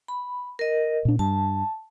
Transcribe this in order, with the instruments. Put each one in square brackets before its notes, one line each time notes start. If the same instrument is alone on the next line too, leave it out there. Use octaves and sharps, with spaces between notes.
[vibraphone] B5
A#4 D#5
[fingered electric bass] A#2 D4
[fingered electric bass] G2 [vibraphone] A5